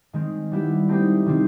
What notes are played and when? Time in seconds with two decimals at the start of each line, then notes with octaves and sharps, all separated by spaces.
0.13 D#3 G#3 C4
0.52 G3 B3 E4 G4
0.89 A3 C4 D#4 G4 C5
1.26 C3 D#3 G3 C4